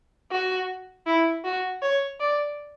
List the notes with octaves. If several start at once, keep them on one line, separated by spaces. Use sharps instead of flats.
F#4
E4
F#4
C#5
D5